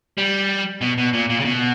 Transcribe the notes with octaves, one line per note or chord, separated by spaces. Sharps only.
G3
B2
B2
A#2
A#2
C#3
B2